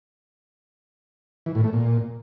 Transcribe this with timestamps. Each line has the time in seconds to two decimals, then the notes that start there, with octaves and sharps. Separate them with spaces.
1.46 E3
1.55 A2
1.64 A3
1.73 A#2